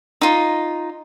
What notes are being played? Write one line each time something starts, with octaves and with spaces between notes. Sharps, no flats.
D#4 F4